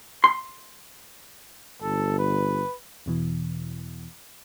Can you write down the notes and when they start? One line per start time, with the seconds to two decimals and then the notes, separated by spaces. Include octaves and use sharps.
0.24 C6
1.82 G1 A4
2.19 B4
3.06 E2 B2 E3